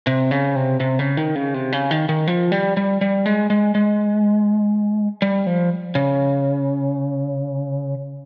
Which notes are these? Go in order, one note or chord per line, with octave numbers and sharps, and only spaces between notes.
C3
C#3
C3
C3
C#3
D#3
C#3
C3
C#3
D#3
D#3
F3
G3
G3
G3
G#3
G#3
G#3
G3
F3
C#3